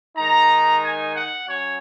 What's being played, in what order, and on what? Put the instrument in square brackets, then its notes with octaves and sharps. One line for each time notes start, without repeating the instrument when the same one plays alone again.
[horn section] D#3 G#3 D#4 A#5
G#5
F#5
F#3 C#4 C#5